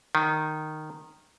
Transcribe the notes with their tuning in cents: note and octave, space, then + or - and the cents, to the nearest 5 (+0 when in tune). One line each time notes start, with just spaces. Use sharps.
D#3 -10